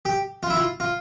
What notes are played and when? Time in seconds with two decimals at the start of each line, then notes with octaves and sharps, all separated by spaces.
0.05 G4
0.43 F4
0.50 E4
0.57 F4
0.80 F4